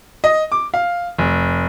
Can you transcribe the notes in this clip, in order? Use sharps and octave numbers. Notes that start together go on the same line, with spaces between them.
D#5
D6
F5
F1